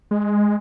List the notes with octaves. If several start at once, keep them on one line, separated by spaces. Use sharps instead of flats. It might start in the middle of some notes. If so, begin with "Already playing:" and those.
G#3